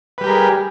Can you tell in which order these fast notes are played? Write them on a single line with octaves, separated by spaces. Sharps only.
B4 G3 G4 A#4 G#4